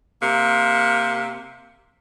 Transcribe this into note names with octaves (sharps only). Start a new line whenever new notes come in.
C3 A#3